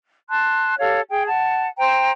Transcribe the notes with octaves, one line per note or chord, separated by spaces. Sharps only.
A5 C6 F#6
G4 A4 C#5 F5
G#4 G5
F#5 A5
C5 G5 A#5